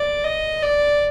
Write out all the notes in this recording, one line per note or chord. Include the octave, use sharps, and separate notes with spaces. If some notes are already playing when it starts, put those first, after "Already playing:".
Already playing: D5
D#5
D5